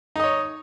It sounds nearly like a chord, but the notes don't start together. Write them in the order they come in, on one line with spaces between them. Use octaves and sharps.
D#4 D#5 C#5